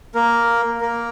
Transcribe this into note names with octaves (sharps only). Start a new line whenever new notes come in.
A#3 A#4
A#3 A#4